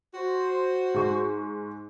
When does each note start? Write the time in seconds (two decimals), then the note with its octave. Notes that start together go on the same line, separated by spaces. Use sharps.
0.14 F#4 C5
0.94 G#2 C#6